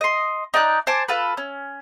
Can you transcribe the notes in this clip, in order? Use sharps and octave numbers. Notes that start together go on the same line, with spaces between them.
D#5 C6
D#4 D5 A5 F#6
C5 G#5 A5 D6
F4 A4 B4
C#4